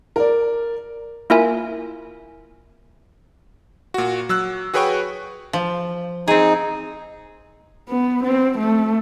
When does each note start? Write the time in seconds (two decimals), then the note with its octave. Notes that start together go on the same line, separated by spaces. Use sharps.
0.16 A#4 D5
1.30 A#3 E4 F4 A#4 E5 G#5
3.94 A#2 F#4
4.29 F#3 E6 F#6
4.74 F#4 G#4 B4 C#5 G5 C#6
5.53 F3
6.28 C4 D#4 G#4
7.89 B3
8.23 C4
8.58 A3